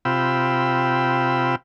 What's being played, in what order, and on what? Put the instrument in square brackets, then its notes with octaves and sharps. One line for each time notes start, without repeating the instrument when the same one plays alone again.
[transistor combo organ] C3 F4 G5 B5 E6